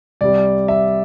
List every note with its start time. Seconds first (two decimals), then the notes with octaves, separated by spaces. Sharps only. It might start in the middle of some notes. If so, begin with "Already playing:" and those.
0.21 C2 C3 G3 D5
0.68 E5